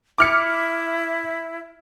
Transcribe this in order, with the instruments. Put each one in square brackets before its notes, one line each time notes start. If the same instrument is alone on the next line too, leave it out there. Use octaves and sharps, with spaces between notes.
[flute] E4 [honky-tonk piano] D6 F6 C#7